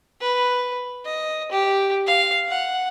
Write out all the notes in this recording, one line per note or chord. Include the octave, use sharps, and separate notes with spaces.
B4
D#5
G4
F5
F#5